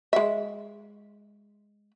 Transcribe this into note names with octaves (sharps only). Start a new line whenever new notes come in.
G#3 E5